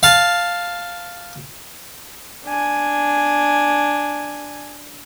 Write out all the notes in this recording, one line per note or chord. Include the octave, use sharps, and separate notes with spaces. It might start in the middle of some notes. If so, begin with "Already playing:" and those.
F5 A5
D4 G#5